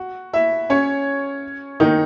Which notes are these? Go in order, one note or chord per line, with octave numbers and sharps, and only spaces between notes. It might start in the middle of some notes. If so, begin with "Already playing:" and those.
Already playing: F#4
E4 E5
C#4 C#5
D#3 D#4